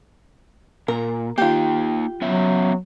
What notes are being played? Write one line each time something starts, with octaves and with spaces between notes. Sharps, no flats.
A#2 A#4
A#3 D#4 F4 G4
F#3 B3 C#4 E5